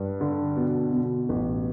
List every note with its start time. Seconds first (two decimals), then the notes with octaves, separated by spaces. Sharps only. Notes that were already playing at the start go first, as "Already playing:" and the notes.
Already playing: G2
0.21 D3
0.56 B2
0.93 B2
1.29 A1